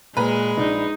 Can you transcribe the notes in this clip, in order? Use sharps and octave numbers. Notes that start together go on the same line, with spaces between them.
A#2 G#3 B4 A#5
A#1 D#4 D5